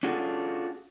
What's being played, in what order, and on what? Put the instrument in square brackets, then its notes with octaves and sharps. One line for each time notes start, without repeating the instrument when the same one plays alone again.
[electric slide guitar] C#4 D4 F4 F#4 G#4 A4